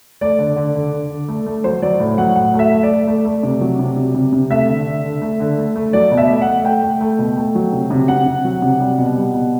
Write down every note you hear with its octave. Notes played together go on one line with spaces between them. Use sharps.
A3 D5
D3
D3
D3
D3
D3
A3
A3
F#3 C5
F#3 D5
A2
F#3 F#5
A2 F#5
A3
E5
A3
D5
A3
A3
A3
C3
F#3
C3
C3
C3
C3
A3 E5
D3
D3
D3
A3
D3
A3
A3
F#3 D5
B2
E5
A3
F#5
A3
A3 G5
A3
A3
B2
A3
F#3
C3
C3
C3 F#5
C3
F#3
C3
G3
B2
G3
B2